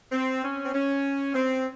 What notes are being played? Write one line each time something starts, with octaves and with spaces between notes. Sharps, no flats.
C4
C#4
C4
C#4
C4